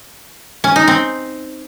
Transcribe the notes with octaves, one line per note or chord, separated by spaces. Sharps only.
C#4
D#4
C4